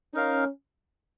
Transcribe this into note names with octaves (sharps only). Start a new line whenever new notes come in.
C#4 D#4 A#4 F5